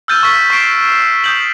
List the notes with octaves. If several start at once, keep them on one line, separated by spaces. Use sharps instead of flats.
E6 F6 G6 A6 D#7
C#6 B6
C#6 C7 D7 E7
D#6 G6 F#7